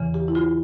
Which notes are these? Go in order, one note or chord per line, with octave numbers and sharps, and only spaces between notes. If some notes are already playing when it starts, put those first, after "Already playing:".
Already playing: E2 C#3 E3
G4
E4
F4